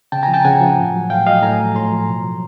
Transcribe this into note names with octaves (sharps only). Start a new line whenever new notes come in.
C#3 G5 A5
G#5 A#5
F3
G5 A5
C#3 F#5 G#5
F3
A2
F#3
A2 F5 G5
F#3 D#5 F5
A2 G#5 A#5
F3
A2 A#5 C6
F3
B2
F#3